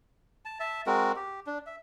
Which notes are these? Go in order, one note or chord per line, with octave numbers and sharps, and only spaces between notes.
A5
E5 A5
G#3 C4 F#4 A#4
G4
D4
E5